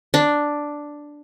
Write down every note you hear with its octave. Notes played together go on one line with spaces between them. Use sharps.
D4